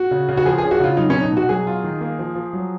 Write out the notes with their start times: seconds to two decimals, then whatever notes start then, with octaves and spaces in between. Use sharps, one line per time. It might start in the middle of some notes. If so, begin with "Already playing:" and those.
Already playing: F#4
0.11 C#3
0.28 C#3
0.37 F#4
0.45 F3 G#4
0.58 G#4
0.63 C#4
0.71 F#4
0.79 C#3 F4
0.97 F#3 D#4
1.10 B2 C#4
1.23 D#4
1.32 B2
1.37 F#4
1.49 F#3 G#4
1.67 F4
1.84 D#3
2.01 A#3
2.19 F3
2.35 F3
2.53 F#3